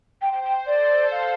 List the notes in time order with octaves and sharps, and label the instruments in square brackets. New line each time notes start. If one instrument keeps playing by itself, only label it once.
[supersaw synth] C5 [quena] G5
[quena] G5
G5
[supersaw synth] A4 [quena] D5
[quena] F5